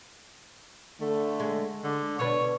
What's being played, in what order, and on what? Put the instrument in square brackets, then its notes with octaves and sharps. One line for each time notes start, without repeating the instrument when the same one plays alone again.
[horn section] D3 A3
[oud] G#3
[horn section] D3
[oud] B2 D4 B4 [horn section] C#5